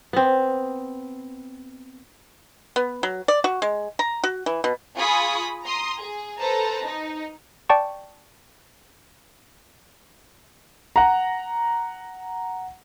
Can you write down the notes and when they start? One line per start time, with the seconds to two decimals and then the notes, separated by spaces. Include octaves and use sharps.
0.13 B3 C4
2.76 B3
3.03 F#3
3.28 D5
3.44 F#4
3.62 G#3
3.99 A#5
4.24 F#4
4.46 E3
4.64 B2
4.97 F4 G#4 G#5 B5 C#6 D#6
5.64 A#5 C6 D#6
5.98 G#4
6.41 A4 B4 C5 A5 A#5
6.84 D#4
7.69 D5 G5 A5 C#6
10.96 F#5 A#5